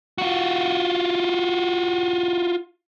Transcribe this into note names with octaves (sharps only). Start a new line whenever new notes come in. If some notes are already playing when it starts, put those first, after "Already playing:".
F4 F#4